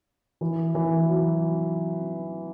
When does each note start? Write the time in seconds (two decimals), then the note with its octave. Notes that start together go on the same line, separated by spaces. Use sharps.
0.41 E3
0.75 E3
1.09 F#3